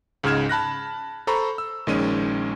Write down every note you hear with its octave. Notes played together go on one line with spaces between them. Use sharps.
C#2 G#2 C#3 F6 G#6 E7
A5 B5 F#6 A#6
A4 C5 A#5 B5 C#6
E6
A#1 D#3 G#3 C#4 D#7